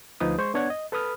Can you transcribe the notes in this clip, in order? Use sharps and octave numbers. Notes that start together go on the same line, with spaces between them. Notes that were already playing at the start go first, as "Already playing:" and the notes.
D2 F3 D#4 B4 D#6
G#3 C5 C6 C#6
B3 D4 C#5 D5 F#5 G#6
D#5
A4 B4 B5 D#6 F6